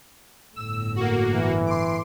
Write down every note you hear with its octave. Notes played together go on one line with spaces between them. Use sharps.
G1 A2 E6
A#3 F#4
E3
C6 D6